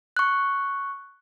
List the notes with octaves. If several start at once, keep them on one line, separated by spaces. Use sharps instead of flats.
C#6 F#6